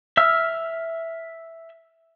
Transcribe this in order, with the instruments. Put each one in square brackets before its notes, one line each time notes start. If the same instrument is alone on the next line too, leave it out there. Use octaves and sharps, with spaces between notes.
[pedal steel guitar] E5 E6 F6